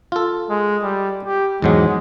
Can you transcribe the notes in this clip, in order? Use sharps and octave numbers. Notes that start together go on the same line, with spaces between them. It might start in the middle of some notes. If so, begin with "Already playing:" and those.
F4 A4
G#3
G3
G4
E2 G#2 F#3 G#3